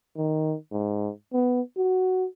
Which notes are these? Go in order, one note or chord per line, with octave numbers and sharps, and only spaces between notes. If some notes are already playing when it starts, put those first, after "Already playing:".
D#3
G#2
B3
F#4